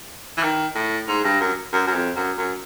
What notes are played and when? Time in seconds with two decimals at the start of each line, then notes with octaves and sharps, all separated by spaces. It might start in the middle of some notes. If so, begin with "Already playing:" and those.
0.37 E3
0.43 D#3
0.75 A2
1.08 G#2
1.24 G2
1.40 F#2
1.73 F#2
1.87 F#2
1.94 F2
2.16 F#2
2.38 F#2